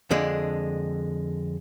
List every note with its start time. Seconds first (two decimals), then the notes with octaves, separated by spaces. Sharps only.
0.11 F2 D3 G#3 D4